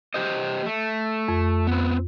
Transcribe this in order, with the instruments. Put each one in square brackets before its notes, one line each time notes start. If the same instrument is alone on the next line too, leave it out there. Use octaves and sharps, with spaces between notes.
[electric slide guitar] G4 C5 D#5
A3
[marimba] F2
[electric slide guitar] B3 C4